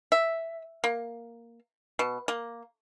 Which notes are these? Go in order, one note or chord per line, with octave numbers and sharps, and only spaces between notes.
E5
A#3
B2
A#3